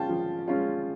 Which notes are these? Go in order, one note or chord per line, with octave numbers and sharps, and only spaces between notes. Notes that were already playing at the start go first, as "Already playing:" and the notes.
Already playing: G#3 C#4 F4 G5 A5
F3
G#3 C#4 F4